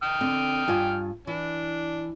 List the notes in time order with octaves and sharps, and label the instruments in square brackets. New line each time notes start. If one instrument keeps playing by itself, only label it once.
[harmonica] G5 D#6 F6
[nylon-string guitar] D3 C4
G2 F4 G#5
[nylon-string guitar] E3 [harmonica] D4